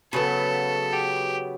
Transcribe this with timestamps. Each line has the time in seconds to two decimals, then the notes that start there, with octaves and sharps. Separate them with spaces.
0.12 C#3 F#3 B3 A4
0.93 G4